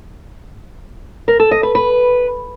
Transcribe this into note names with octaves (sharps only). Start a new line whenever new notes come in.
A#4
A4
D#5
B4
B4